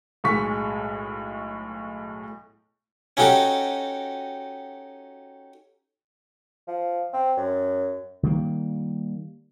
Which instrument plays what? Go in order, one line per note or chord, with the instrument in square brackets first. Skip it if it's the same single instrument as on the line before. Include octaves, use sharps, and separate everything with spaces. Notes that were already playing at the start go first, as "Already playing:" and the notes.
[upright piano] B1 A2 G#3 C#6 B6
[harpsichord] C#4 D#4 F#4 G4 A4
[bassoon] F3
C4
F#2
[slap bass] D#3 G3 A#3